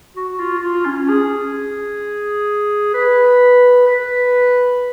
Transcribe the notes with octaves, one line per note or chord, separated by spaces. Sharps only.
F#4
F4
F#4
F4
C#4
G#4
B4
B4